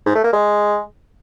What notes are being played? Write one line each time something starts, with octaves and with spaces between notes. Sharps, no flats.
G#2
A3
A#3
G#3